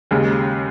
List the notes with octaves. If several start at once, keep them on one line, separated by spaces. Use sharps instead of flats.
D#2 C#3 G#3